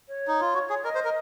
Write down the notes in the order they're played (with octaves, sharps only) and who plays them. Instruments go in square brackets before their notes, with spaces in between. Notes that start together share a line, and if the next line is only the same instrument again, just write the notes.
[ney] C#5
[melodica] D#4
F4
F#4
G#4
[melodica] A#4 [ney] D#5
[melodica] C5
A#4